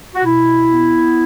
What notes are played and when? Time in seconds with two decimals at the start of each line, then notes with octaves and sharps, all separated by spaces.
0.14 F#4
0.24 B2 E4
0.69 B3